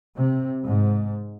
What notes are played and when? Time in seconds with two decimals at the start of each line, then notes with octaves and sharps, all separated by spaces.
0.17 C3
0.65 G#2